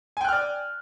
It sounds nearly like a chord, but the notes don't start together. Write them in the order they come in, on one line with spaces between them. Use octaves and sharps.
G#5 G5 F#6 F6 D5